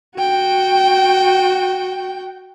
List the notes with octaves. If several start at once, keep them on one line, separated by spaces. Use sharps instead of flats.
F#4 G5